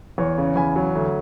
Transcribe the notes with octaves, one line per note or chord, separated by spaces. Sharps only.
E2 C#5
C#3
E2 G#5 B5
F#3
D2